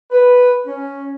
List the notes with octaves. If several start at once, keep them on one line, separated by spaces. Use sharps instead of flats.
B4
C#4